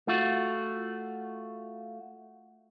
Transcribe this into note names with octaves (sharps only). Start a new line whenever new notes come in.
A3 F4 F#4